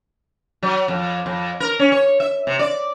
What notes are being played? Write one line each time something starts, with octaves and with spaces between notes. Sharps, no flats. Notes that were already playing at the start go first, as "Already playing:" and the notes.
F#3
F2
F2
A#4
C#4
C#5
E5
C3
D5